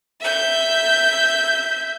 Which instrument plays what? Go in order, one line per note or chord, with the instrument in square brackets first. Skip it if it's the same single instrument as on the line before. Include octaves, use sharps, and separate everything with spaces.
[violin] E5 G6